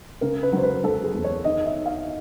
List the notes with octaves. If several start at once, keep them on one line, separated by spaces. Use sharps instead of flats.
C#3 A#4
B4
F#3 C5
B4
F#3 A4
G#4
E2
C#5
D#3 D#5
E5
D#3
F5